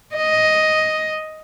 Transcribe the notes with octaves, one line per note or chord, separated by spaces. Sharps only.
D#5